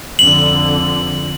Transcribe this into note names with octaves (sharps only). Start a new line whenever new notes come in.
F2 D3 F#7